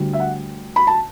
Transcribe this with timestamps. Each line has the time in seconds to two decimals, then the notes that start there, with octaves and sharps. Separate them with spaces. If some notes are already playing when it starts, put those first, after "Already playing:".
Already playing: D2 D3 G3
0.13 E5
0.20 F#5
0.76 B5
0.87 A5